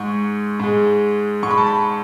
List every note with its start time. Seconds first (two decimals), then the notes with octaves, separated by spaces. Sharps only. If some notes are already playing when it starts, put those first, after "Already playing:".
Already playing: G#2 G#3 C#6
0.60 G#2 G#3
1.43 G#2 G#3 C#6
1.50 B5
1.58 A5
1.67 B5